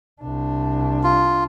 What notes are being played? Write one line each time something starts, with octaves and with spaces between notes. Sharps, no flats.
C2 D4
F4